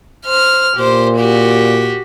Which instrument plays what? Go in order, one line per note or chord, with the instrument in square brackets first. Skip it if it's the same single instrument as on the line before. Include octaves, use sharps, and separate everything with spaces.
[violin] C5 F6
[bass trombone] A#2 [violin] G4 C5
[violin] F#4 G4